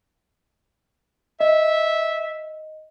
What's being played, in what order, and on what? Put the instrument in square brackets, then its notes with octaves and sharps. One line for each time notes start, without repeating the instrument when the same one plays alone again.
[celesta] D#5 [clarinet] E5